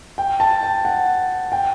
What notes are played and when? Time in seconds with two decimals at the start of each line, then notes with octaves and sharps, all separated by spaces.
0.18 G5
0.40 A5
0.63 G5
0.85 F#5
1.52 G5